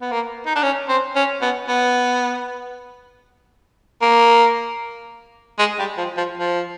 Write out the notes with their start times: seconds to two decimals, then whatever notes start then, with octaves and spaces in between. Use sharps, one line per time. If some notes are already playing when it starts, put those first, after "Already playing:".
0.01 B3
0.11 A#3
0.46 D#4
0.55 D4
0.63 C#4
0.89 C4
1.15 C#4
1.42 B3
1.68 B3
4.01 A#3
5.59 G#3
5.79 G3
5.97 F3
6.17 F3
6.37 F3